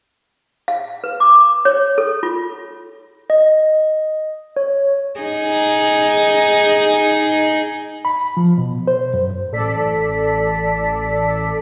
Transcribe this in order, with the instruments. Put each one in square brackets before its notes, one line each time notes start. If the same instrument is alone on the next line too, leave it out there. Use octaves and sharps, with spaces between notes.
[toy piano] F5
B4
D6
C#5
A4
F4
[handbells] D#5
C#5
[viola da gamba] D#4 G#4
[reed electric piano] B5
F3
B2
C5
F#2
[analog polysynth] A1 A4 D5 B6